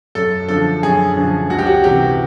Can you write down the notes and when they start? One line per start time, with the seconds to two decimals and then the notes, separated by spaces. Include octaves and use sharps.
0.15 F#2 A4
0.48 D3 F3 A4
0.83 F#2 G#4
1.17 D3 F3
1.50 C#2 F#4
1.59 G4
1.66 F#4
1.84 C3 E3 G4